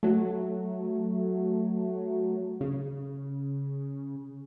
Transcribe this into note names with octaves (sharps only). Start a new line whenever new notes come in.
F#3 A3
C#3